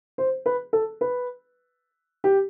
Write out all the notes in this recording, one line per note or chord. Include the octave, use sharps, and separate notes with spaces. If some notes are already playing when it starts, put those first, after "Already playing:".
C5
B4
A4
B4
G4